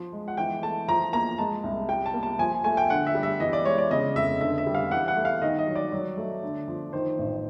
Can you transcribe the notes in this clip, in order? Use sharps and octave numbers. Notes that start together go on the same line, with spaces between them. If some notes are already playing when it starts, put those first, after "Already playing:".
Already playing: F3
G#3
F#5
E3 G5
A3 A5
F3 A#5
A#3 A#5
G#3 A5
C2
G3 G5
A5
A#3
A5
F3 G#5
A3 G#5
G5
D3 F#5
E5
G3
E5
E3 D#5
D5
G#3 C#5
D5
C#3 D#5
F1 E5
D3 E5
E5
G3
F5
E3 F#5
F#5
A3
F5
D#3 D#5
D#5
F#3
D5
F#3
A3
D3
F3
D#3 C5
A1